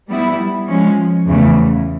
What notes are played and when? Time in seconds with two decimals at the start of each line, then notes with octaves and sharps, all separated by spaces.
0.08 G3 B3 E4
0.67 F3 G#3 C#4
1.26 E2 C#3 E3 A3